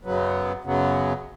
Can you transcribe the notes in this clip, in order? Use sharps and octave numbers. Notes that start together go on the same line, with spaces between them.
F#2 C#3 F#3 B3
F#2 C#3 F#3 B3